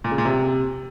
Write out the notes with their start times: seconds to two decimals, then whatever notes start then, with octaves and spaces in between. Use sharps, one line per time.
0.04 A#2
0.11 C#3
0.18 A#2
0.25 C3